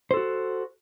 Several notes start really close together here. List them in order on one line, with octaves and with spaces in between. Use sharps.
C5 A4 F#4